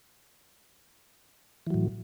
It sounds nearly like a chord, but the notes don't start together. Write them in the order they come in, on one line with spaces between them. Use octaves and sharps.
E3 F#3 A2